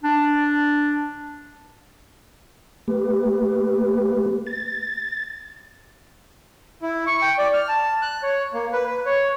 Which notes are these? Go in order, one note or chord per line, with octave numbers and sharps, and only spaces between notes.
D4
A3 A#3 G4 B4
A6
E4
C#6
G5
D5
F6
A5
F#6
C#5
A#3
B4
B4
C#5